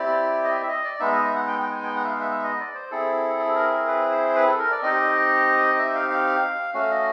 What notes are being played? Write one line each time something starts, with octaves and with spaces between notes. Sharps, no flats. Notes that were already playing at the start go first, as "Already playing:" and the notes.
Already playing: C4 E4 G4 D5
D#5
E5
E5
D#5
D5
G#3 B3 D#4 E5
D#5
E5
F#5
G5
G5
G#5
G5
F#5
E5
F5
E5
E5
D#5
D5
C5
C4 E4 G#4 A4
A4
A#4
A#4
B4
C5
B4
A4
A#4
D5
C4 D#4 G4 D#5
E5
F5
F5
A3 C#4 F#4 F5
D#5